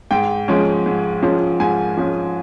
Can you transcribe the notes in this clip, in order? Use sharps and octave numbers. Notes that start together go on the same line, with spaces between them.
G#2 G5
F3 G#3 C#4
G#2
F3 G#3 C#4
G#2 G#5
F3 G#3 C#4